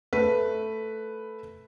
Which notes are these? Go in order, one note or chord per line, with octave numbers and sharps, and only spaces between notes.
A3 B4